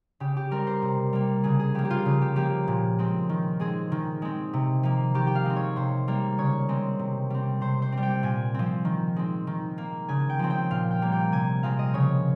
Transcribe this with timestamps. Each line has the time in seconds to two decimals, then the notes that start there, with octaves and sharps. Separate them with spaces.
0.20 C#3 G4
0.37 G4
0.51 G3 C4 A#4
0.67 C5
0.82 C3
1.13 G3 A#3
1.43 C#3 G#4
1.59 G#4
1.75 F3 A#3 G4
1.85 G4
1.90 F4
2.06 C#3
2.21 G4
2.36 F3 A#3 G4
2.68 A#2
2.99 G#3 C4
3.29 D#3
3.60 G#3 C4 G#4
3.92 D#3
4.22 G#3 C4
4.53 C3
4.83 F3 A#3
5.14 D#3 G4
5.27 G5
5.35 F5
5.45 G#3 C4
5.56 C#5
5.76 C3 C5
6.08 G3 A#3
6.38 C#3 C#5
6.69 G#3 C4
6.99 C3
7.30 G3 C4
7.61 C3 C5
7.82 C5
7.92 C4
7.97 G3
8.03 G5
8.23 A#2 G#5
8.54 F3 C4
8.85 D#3
9.16 G#3 C4
9.47 D#3
9.78 A#3
10.09 C#3 G#5
10.29 G5
10.39 F3 G#3 C4
10.50 G5
10.71 A#2 F5
10.91 G5
11.02 G3 A#3
11.12 G5
11.32 C3 G#5
11.63 F3 G#3 C4 F5
11.79 D#5
11.94 C#3 C#5